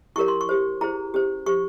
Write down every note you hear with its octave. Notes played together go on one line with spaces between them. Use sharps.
E4 G4 A#4 C#5 C#6
C6
C#6
G4 C5
E4 G#4 C5 A#5
C#4 G4 C5
G4 C5 C#6